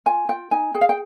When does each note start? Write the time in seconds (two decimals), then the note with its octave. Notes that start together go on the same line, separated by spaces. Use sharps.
0.06 F4 G#5
0.29 F4 G5
0.51 D#4 G#5
0.74 G#4 G5
0.81 F5
0.89 G5